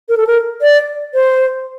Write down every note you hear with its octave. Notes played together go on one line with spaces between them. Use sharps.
A#4
A4
A#4
D5
C5